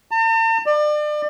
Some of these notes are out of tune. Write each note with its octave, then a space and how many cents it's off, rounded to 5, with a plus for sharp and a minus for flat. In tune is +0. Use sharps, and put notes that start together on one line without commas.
A5 +45
D5 +35